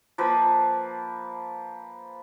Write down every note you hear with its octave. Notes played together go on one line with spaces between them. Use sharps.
F3 A#3 B4